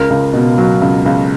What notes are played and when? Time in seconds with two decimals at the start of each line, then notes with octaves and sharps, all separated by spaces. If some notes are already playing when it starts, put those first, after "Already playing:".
Already playing: C#2 A#4
0.10 C#2
0.33 B2
0.58 F#3
0.82 C#2
1.06 C#2